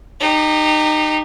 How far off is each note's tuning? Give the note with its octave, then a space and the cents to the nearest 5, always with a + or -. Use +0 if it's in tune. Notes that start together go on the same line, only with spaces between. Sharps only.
D#4 -20 G4 +15